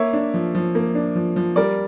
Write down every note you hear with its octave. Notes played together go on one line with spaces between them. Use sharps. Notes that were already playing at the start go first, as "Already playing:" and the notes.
Already playing: A#3 C#5 E5
D4
F3
F3
A#3
D4
F3
F3
G3 A#4 D5